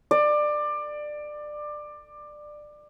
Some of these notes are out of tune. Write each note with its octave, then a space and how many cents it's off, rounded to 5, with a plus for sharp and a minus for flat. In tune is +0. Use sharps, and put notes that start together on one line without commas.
D5 +20